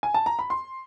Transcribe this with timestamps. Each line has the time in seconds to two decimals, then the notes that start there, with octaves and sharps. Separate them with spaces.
0.03 G#5
0.14 A5
0.26 A#5
0.39 B5
0.50 C6